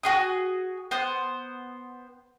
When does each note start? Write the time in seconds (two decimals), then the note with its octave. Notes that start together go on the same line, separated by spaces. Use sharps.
0.03 F#4 G#4 D#6
0.91 B3 C5